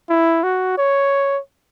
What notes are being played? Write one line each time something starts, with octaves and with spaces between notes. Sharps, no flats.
E4
F#4
C#5